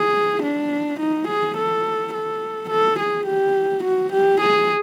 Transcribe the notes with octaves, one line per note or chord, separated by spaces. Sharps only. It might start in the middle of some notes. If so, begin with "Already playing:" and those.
Already playing: G#4
D4
D#4
G#4
A4
A4
A4
G#4
G4
F#4
G4
G#4